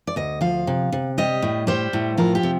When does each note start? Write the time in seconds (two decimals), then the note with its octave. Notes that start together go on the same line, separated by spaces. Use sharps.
0.07 D5
0.16 D2 D#5
0.41 F3 F5
0.67 C3
0.92 C3
1.18 G3 D#5
1.42 A2
1.67 G3 C5
1.93 A2
2.17 F3 A#4
2.35 G4
2.43 C3